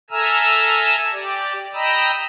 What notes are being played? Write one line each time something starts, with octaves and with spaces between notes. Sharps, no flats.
A4 E5 G#5 A#5 E6 F6
G4 D5
D#5 G5 A#5 B5 D#6 E6